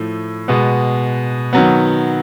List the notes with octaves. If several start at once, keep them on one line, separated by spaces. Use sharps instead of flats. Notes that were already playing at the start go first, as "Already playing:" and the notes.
Already playing: A2 F3 A3
B2 G#3 B3
D#3 F#3 B3